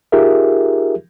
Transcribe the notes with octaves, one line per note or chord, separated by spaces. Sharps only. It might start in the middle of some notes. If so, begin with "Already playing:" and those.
D#4 F4 G4 G#4 A#4 E5